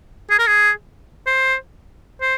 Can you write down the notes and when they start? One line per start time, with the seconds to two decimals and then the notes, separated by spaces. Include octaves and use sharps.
0.30 G#4
0.39 A#4
0.47 G#4
1.27 C5
2.21 C5